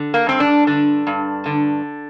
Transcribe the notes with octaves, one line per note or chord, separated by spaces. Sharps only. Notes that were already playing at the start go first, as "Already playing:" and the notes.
Already playing: D3
A#3
G2 C4
D4
D3 D4
G2
D3